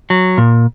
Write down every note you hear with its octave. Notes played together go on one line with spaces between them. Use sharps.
F#3
A#2